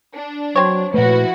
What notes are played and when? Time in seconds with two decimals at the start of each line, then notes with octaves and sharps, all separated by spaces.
0.14 D4
0.56 F#3 C4 C#5
0.94 A#2 F3 A3 E4 F#4 B4